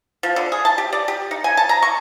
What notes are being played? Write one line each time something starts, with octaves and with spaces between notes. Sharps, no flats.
F3
D3
G#4
A5
G4
D5
G4
D#4
G#5
A5
A#5
C#6